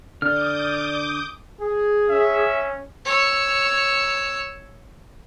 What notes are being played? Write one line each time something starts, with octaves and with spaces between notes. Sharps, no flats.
D3 D5 D6 D#6 F6 G6
G#4
C#4 E5
C#5 E6